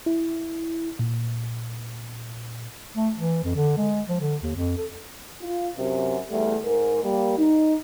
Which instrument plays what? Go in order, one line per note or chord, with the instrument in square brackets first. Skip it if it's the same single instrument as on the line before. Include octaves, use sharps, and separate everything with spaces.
[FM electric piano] E4
A#2
[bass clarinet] A3
E3
F2
D3
G#3
F3
D3
D#2
F2
A4
[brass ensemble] F4
F#2 C3
E2 G3 A3
G#2 A#4
G3 A#3
D#4